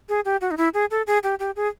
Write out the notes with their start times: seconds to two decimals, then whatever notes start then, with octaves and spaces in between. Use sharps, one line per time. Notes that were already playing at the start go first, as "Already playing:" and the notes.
0.09 G#4
0.25 G4
0.41 F#4
0.51 D#4
0.57 E4
0.74 G#4
0.91 A4
1.07 G#4
1.23 G4
1.40 G4
1.56 G#4